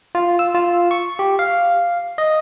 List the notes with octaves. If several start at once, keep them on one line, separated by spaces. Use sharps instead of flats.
F4
E6
F4
C#6
G4
F5
D#5